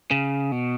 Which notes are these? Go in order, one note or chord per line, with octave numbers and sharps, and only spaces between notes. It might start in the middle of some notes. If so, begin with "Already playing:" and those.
C#3
B2